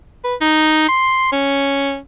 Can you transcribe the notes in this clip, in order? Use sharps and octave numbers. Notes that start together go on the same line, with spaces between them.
B4
D#4
C6
C#4